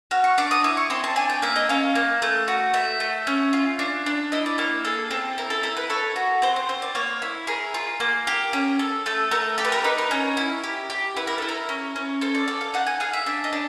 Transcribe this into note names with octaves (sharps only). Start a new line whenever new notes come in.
F#4 F6
C#6
D4 D6
D#6
E4 D6
C#6
C4 C6
A5
D4 G#5
G5
A#3 E5
D#5
C#4 F5
A#3
A3
F#4
A3 E5
A3
C#4
F4
D4
D4
E4 D#5
D5
A#3 C#5
G#4 A4
C4 A4
E4 A#4
A4
E4 A#4
B4
A4 C#5
F#4
C4 C5
C5
C4 C5
D5
A#3 C#5
E4
G#4 A#4
F4
A#3
G4
C#4
A4
A3 A4
A3 A#4
G4 A4
B4
A#4
D#4 B4
A#4
C#4
E4
G4
G4
E4 B4
A#4
E4 A4
A#4
C#4
C#4
A4 C5
D5
A4 D5
F5
D#4 F#5
G#5
G#4 F5
E5
D4 E5
D#5
D4